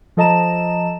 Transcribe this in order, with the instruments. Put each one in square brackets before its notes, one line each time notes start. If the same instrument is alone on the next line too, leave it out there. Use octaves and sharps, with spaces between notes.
[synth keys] F3 A4 D#5 A5 A#5 E7